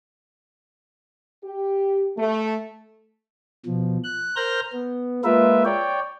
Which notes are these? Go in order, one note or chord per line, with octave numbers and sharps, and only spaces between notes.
G4
A3
B2 F3
F#6
A#4 C5 F6 G6 A#6
B3
G#3 A#3 F4 A#4 B4 E5
C#5 D5 G5